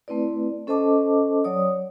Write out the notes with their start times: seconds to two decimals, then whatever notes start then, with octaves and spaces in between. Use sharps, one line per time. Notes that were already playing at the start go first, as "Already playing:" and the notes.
0.08 A3 C4 E4 B4 D5
0.67 C#4 A4 C5 D#5 A5 D6
1.44 F#3 C#5 D5 D#6